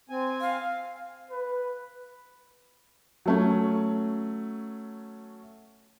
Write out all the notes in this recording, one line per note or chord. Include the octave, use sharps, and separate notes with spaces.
C4 G#5
F5
B4
F#3 A3 C#4